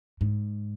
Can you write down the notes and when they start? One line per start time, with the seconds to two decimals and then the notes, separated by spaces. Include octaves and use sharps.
0.21 G#2